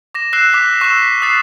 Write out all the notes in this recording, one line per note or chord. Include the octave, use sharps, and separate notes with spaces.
D6 A#6 E7
E6 F#6 C7 E7
D6 F#6 B6
C#6 E6 F#6 E7
B6
D#6 F#6 A6 C7